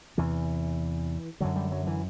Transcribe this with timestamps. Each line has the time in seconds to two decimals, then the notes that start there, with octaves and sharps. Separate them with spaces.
0.17 E2 C3 E3
1.40 F#2 D3 F#3
1.56 G3
1.72 F#3
1.87 E3